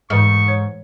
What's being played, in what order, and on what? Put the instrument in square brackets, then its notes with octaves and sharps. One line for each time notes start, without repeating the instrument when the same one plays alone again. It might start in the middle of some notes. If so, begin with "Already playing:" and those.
[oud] G#2 [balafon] E3 G#3 [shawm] C#6
[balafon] C#5